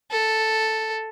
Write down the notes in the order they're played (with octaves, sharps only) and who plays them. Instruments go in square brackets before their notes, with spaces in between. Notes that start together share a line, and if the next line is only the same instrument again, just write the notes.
[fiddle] A4